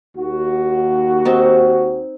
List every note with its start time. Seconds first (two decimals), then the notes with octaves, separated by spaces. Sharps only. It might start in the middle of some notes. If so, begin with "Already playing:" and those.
0.16 D#2 F#4
1.25 C4 D#4